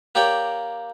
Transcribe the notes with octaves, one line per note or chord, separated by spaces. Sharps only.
A#3 G4 A#4 C#5 D5 G5